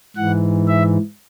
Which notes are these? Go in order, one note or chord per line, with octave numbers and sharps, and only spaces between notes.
G#2 E3 F#5
E5